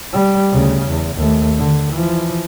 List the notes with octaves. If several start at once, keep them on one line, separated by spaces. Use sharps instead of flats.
G3
D2 C#3
E2
D#2 A3
D3
E3 F3